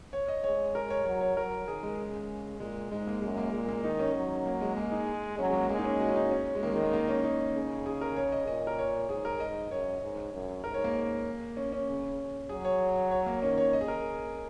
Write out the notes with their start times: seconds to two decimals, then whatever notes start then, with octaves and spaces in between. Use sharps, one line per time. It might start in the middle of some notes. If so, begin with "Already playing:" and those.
0.13 C#5
0.28 D#5
0.43 G#3 C#5
0.75 A#4
0.90 C#5
1.05 F#3 C#5
1.21 C#5
1.36 F#3 A#4
1.68 D#3 G#4
1.83 G#3
1.98 C#3
2.60 A#2 G#3
2.91 G#2 G#3
3.07 A#3
3.22 F#2 G#3
3.37 A#3
3.53 A#2 G#3
3.68 A#3
3.84 D#3 D#4
3.99 C#4
4.15 F#3
4.46 A#3
4.61 G#3
4.76 G#3 A#3
4.92 D#4
5.38 F#3 C#4
5.50 G#3
5.54 A#3
5.69 G#3 A#3
5.78 D#4
5.84 C#4
6.00 F#4
6.09 C#4
6.16 D#4
6.31 C#4
6.55 G#3
6.62 D#3 A#3
6.72 G#3
6.83 A#3
6.93 A#3
7.09 C#4
7.24 D#4
7.55 C#3
7.86 G#4
8.01 A#4
8.16 C#5
8.32 D#5
8.47 A#2 D#5
8.67 A#4
8.79 C#5
9.09 G#2 G#4
9.25 A#4
9.40 G#2 D#5
9.71 F#2 C#5
10.02 G#2
10.33 F#2
10.64 G#2 A#4
10.74 C#5
10.84 A#3
11.57 C#4
11.72 C#4
11.87 C#3
12.49 F#3 G#4
12.65 C#5
13.11 C#5
13.26 A#3
13.42 D#3 C#4
13.58 C#5
13.73 D#5
13.81 G#4
13.88 A#4